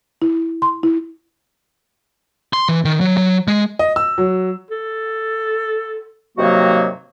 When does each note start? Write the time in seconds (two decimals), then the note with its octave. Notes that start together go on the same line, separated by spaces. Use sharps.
0.22 E4
0.62 C6
0.83 E4
2.53 C6
2.69 E3
2.85 D#3
3.01 F#3
3.17 F#3
3.48 G#3
3.79 D#5
3.96 E6
4.18 F#3
4.71 A4
6.37 G2 C3 D#3 F#3 A#3 F#4